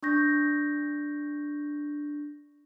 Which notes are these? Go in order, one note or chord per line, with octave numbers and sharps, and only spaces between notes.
D4 C#6 G6 A#6